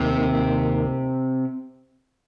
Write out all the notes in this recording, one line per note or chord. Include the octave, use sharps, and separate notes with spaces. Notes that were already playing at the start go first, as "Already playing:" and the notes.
Already playing: D#2 C3 D#3 A#3